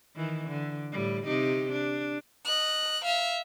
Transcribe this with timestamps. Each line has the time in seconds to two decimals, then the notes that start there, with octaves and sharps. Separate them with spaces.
0.16 D#3 E3
0.49 D3
0.92 A2 G3
1.25 C3 D#4 G4
1.72 D4
2.45 D#5 F#6
3.05 E5 F5